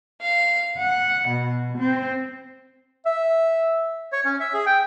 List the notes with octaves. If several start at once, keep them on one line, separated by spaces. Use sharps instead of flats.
F5
F#5
B2
C4
E5
C#5
C#4
E5
G#4
G5